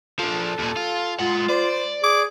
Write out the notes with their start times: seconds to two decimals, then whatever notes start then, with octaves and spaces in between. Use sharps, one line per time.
0.20 F3 D4 A4
0.59 D#2 A#2
0.77 F4
1.20 G#3 F4 F#5
1.49 C5 D5
2.03 G#4 D6